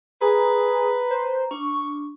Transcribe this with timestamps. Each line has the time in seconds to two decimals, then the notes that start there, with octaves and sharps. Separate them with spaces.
0.21 G#4 B4 A#5
1.10 C5
1.51 D4 C#6